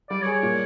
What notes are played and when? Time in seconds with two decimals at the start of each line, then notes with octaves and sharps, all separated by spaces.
0.10 G3 D5
0.22 C#5
0.26 G#4
0.32 C#5
0.43 A#2